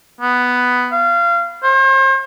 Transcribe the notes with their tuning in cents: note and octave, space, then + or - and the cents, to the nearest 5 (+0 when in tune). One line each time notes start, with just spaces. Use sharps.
B3 +5
F5 -25
C5 +40